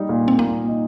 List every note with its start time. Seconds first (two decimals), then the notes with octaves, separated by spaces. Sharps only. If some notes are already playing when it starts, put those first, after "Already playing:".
Already playing: G3 D#4
0.09 A#2
0.28 C4
0.38 A#2 A#3
0.68 D#4